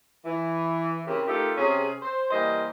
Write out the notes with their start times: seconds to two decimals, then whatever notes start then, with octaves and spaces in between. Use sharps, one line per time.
0.25 E3
1.07 C#3 C4 E4 G4 A#4
1.27 A3 D#4 F4 G4 A4 A#4
1.57 C3 C#4 G#4
2.03 C5
2.31 E3 G3 A#3 C5 D#5